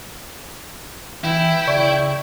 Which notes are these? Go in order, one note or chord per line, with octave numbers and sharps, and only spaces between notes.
E3 E4 G5
C#3 D5 C#6